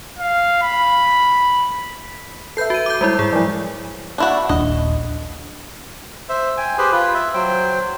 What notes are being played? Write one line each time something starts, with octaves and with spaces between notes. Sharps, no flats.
F5
B5
A4 B4 E5 G6 C7
F#4 D#7
D6 G6
G3 G#3 E4
G#2 G#4
F3 F#3 E4 D5
D4 E4 F#4
D#1 A#1 D4 D#5
C5 E5
G5 G#5
G4 G#4 B4 C5
F4 B4
E5
F#3 C5 G5